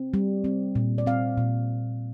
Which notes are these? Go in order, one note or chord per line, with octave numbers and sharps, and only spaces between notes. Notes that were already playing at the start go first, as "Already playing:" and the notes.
Already playing: C4
G3
C4
A#2
D5
C4 F5
A#2